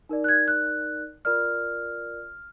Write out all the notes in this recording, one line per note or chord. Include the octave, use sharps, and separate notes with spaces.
D#4 A#4 D5
F#6
G#6
F#6
F4 A#4 D5 F6